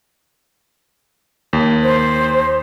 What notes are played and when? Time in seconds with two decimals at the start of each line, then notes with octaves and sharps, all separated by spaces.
1.53 D#2
1.83 C5